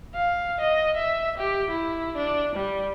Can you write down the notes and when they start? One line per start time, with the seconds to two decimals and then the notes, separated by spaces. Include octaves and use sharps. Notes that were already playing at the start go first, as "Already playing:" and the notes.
0.14 F5
0.60 D#5
0.97 E5
1.38 G4
1.71 E4
2.17 D4
2.55 G3